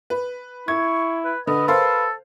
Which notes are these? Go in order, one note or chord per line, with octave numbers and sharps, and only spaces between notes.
B4
E4 C#6 G#6
B4
D3 B4 D#5
A4 A#4 C5 F5